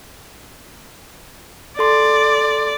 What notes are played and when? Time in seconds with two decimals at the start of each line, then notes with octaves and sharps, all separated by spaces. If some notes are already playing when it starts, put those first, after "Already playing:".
1.79 A4 D5 C6